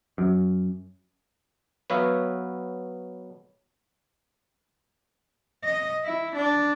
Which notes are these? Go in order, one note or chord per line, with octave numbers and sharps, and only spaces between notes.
F#2
F#3 B3 B4 C#5 E5 F5
D#5
E4
D4